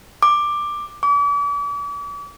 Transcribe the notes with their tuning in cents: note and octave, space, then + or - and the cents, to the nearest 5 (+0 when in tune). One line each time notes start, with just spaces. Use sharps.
D6 +10
D6 -40